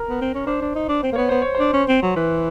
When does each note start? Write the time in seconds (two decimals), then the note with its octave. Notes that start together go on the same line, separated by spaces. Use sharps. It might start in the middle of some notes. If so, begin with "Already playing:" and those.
Already playing: A#4
0.09 B3
0.21 C4
0.34 C#4
0.47 D4 C5
0.61 D4
0.75 D#4
0.89 D4
1.03 C4 C5
1.12 A#3
1.16 B3 C#5
1.29 B3 C5
1.42 C#5
1.55 C5
1.60 D4
1.73 C#4
1.88 C4
2.02 F#3
2.16 E3 B4